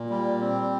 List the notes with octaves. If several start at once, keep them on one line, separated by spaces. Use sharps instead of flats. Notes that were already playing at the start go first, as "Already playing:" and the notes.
Already playing: A#2
G3
C4